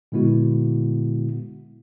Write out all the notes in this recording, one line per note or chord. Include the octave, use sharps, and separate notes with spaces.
A#2 D3 G#3 B3 E4 F#4